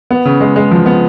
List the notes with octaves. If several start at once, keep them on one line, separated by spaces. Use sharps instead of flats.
B3
C#3
G#3
G#3
F3
B3